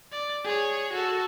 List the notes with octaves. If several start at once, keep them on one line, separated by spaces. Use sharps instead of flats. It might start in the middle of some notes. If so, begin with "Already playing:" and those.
D5
G#4 C#5
F#4 A4